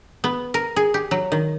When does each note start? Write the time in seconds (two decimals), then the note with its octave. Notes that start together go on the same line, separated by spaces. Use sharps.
0.24 B3
0.54 A#4
0.76 G#4
0.94 G4
1.11 F#3
1.32 D#3